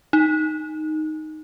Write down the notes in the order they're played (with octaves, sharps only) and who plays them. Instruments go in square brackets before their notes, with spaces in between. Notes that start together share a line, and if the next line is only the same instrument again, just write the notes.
[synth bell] D#4